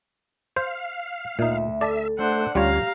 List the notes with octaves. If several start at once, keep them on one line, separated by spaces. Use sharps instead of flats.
C5 F5
D2 A#2 D#4 E5
A4 D5 E5 A5
A3 D4 C5 F#5
D2 G3 C#4 F4 G4 C#5 F5 A#5